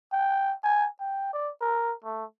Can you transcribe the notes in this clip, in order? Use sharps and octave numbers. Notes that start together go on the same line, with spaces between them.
G5
G#5
G5
D5
A#4
A3